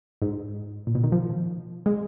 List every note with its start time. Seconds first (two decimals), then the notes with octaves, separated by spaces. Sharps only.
0.22 G#2
0.87 A#2
0.95 B2
1.04 D#3
1.12 F3
1.86 G#3